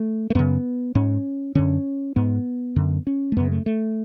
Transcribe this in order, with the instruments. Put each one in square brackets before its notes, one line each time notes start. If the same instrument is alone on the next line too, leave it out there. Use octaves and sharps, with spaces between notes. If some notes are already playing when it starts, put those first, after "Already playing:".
Already playing: [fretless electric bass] A3
A3
F#2 C#3 B3
G#2 C#4
F#2 D3 C#4
G#2 B3
F#2 D3
C#4
A3
F#2 C#3 B3
A3
A3